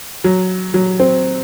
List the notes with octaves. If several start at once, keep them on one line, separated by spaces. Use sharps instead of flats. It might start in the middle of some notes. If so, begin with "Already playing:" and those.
F#3
F#3
C4